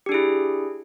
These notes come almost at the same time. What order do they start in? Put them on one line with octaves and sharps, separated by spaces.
G4 D4 G#4 E4